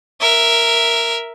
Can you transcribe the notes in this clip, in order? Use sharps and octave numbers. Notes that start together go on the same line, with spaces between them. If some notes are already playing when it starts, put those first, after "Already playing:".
A#4 E5